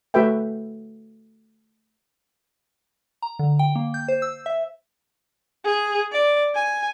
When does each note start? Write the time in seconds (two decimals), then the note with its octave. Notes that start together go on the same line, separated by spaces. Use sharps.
0.14 A3 F#4 A4 B4 E5 G5
3.22 A#5
3.39 D3
3.59 G5
3.76 A#3
3.94 G6
4.08 C5
4.22 E6
4.46 E5
5.64 G#4
6.12 D5
6.55 G#5